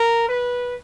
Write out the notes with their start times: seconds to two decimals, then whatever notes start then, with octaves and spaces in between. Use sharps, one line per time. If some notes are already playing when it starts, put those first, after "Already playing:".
Already playing: A#4
0.29 B4